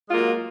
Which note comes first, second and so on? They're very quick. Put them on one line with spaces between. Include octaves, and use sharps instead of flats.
G#3 F4 A#3 F#3